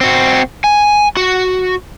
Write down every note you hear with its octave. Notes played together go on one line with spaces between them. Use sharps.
C4 F#4
G#5
F#4